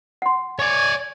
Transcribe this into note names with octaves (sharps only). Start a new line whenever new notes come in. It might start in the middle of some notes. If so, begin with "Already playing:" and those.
F#5 C6
C#5 D5 G#5